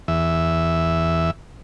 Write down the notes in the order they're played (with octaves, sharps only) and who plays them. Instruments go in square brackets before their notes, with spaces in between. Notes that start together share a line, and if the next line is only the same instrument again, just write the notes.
[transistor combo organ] E2 E5